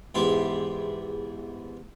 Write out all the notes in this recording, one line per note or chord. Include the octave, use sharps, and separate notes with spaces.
E2 G#2 G4 E5 C6 D6